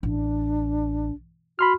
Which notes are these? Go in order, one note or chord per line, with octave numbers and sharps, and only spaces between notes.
A1 D4
F#4 B5 C6 F6